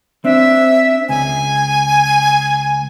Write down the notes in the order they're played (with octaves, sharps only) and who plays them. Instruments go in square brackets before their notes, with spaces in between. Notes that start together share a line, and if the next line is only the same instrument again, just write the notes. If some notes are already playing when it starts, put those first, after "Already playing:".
[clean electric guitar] C4 D4 [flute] E5
[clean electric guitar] C#2 [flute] G#5